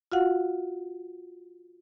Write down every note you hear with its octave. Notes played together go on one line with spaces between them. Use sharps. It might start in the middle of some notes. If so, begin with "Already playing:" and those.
F4 F#4 F5 F#5